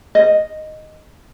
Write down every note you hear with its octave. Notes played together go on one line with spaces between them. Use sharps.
D#5